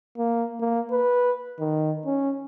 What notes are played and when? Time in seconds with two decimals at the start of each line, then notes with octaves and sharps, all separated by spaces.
0.18 A#3
0.60 A#3
0.91 B4
1.59 D#3
2.06 C#4